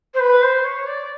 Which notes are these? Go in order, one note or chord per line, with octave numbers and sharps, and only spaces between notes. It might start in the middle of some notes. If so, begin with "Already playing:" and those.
C5
B4
C5
C#5
D5